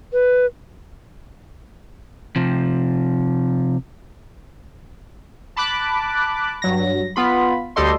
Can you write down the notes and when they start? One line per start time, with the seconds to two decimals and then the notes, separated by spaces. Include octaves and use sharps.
0.13 B4
2.36 C3 F3
5.56 A5 B5 D6 F#6
6.62 G2 F#3 A#6
7.16 B3 F4 B5
7.76 D2 G3 G4 A4 D#5 C6